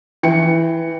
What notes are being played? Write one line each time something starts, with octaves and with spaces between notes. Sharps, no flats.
E3 G5 C#7